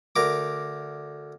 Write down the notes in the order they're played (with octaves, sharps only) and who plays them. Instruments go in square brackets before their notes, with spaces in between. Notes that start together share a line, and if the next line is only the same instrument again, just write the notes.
[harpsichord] D2 A#4 D6